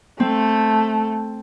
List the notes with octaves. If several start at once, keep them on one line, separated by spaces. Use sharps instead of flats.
A3 C4